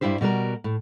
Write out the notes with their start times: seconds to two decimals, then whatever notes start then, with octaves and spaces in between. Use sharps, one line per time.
0.01 G2 A#2 G3 E4 G4 C5
0.21 B2 G3 F#4 A#4
0.64 A2